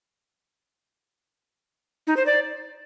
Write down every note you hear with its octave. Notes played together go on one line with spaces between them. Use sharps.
D#4
C5
D5